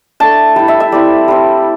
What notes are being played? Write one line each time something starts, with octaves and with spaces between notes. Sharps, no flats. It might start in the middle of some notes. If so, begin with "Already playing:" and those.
A3 D4 A5
G3 E4 G5
E5
E5
G3 C4 E4 D5
G3 C4 E4